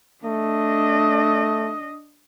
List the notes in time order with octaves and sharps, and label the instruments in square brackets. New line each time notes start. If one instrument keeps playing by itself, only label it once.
[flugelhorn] A3 [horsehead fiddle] D4 D#5